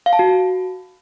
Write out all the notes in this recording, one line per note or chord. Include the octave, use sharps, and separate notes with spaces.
F5
A5
F#4